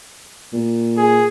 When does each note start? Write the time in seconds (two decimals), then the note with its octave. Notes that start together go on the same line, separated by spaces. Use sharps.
0.53 A#2
0.97 G#4